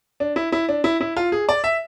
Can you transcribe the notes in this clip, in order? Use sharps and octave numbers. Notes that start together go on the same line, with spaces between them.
D4
E4
E4
D4
E4
E4
F4
G#4
D5
E5